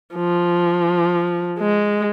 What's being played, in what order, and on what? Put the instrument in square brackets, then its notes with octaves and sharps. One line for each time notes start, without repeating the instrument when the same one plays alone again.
[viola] F3
G#3